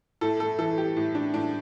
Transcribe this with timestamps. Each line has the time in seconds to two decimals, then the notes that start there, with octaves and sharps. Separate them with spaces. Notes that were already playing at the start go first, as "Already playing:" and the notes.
0.21 A2 A4
0.40 A4
0.58 E3 A4
0.78 G4
0.97 A2
1.15 D4
1.34 A2 D4